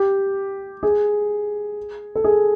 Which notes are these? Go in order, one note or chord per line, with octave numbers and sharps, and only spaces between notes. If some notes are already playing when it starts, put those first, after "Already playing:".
Already playing: G4
G#4
A4
G#4